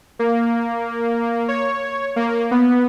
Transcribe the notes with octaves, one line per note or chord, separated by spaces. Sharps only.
A#3
C#5
A#3
B3